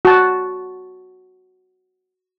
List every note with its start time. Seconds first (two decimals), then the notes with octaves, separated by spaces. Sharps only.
0.05 F#4 A5